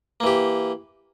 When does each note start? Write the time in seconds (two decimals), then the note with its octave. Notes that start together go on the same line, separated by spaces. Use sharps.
0.20 A#3
0.23 E3
0.26 G4